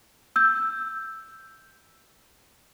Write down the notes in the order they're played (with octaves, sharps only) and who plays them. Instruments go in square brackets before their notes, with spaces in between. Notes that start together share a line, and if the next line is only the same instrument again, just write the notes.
[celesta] E6 G6